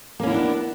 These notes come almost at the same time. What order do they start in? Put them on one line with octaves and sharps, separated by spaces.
A#3 C#4 E4 B3 D4